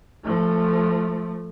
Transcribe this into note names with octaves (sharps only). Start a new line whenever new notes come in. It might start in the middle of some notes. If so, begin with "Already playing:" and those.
F3 A3